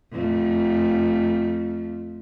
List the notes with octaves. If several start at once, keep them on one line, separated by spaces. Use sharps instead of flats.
F2 A3